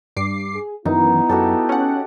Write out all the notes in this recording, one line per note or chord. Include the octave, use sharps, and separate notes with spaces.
G2 D6 C7
G#4
F#2 D#3 E3 B3 D#4 E4
F#2 F#4 G4 A4
C#4 F#5